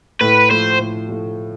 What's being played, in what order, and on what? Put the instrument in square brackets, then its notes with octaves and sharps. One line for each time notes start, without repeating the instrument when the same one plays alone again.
[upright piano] A2 [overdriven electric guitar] B4
[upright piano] F3 A3 [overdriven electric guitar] C5
[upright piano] A2
F3 A3